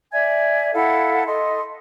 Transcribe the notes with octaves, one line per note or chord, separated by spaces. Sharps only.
D5 E5 G#5 G#6
E4 A4 F5 F#5
A4 D#5 C6